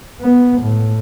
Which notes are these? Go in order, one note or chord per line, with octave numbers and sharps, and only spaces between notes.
B3
A2